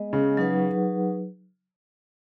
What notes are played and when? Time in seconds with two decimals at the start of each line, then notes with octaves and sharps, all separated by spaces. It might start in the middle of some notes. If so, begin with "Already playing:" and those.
Already playing: G#3 B3 G#4 D#5
0.13 C#3
0.37 F#3 D#4 G#4 B4 F#5